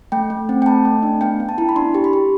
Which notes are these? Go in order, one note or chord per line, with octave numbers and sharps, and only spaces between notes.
A3 G5
A3
C4
G5
A3 A5
A3
D4
B3 G5
B3
A5
E4
B5
D4 C6
G4
B5
G4